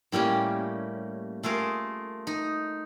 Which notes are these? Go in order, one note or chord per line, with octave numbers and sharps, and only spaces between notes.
A2 G3 A#3 C#4
A3 F4 G#4 A#4
D#4